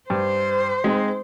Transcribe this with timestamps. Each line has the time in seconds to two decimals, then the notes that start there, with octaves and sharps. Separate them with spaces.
0.10 G2 C5
0.84 G#3 C4 D#4